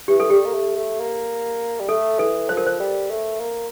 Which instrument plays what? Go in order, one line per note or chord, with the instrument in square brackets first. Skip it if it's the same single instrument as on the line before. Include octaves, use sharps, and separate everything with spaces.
[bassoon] E3 [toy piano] G4
[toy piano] A4
[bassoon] G3 [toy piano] G4
[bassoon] A#3
A3
A3
A#3
G3
[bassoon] A3 [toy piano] A4
[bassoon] E3 [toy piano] A4
[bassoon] F3 [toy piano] C5
[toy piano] A#4
C5
[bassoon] G3
A3
A#3